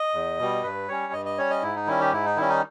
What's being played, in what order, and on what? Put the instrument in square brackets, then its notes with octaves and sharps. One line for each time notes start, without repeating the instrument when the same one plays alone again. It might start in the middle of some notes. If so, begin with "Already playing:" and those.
Already playing: [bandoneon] D#5
E2
B2 G3
G2 B4
G3 C#4 C#5
G2 D#5
D#5
G3 C#4 C#5
D#5
G#2 E4
D#4
D#3 G3 C#4 E4
G4
G#2 E4
D#4
D#3 G3 C#4 E4
D#4